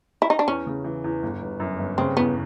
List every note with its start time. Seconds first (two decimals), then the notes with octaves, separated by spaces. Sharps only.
0.22 E4
0.30 D#4
0.39 D4
0.47 E2 C#4
0.67 C#3
0.84 E3
1.04 E2
1.23 G1
1.42 G1
1.60 F#2
1.79 G1
1.98 C#3 C4
2.17 E2 B3